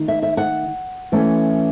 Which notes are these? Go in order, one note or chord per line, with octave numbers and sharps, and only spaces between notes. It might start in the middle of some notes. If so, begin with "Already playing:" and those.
Already playing: D#3 A3 D#4
E5
E5
F#5
E3 A3 C#4